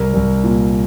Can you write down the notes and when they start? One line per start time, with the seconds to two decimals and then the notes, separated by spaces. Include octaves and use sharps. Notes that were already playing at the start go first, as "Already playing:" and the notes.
Already playing: C2 A#4
0.14 C2
0.44 A#2